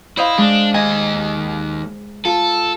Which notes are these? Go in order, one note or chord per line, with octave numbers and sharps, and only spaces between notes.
E4 C5 D#5 F5
G#3 D4
D#2 D#5 G#5
F4 A4